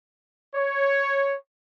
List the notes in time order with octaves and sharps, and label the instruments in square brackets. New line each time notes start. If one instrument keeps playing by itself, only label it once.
[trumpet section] C#5